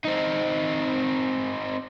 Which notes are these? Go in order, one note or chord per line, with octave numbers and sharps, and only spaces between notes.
C4 D#4